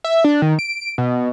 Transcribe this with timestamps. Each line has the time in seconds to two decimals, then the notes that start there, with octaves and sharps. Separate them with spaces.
0.04 E5
0.24 D4
0.42 D#3
0.59 D7
0.98 B2